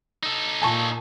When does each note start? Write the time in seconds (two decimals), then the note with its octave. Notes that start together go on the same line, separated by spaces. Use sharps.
0.23 D#4 A4
0.62 A#2 G#5 A5 C#6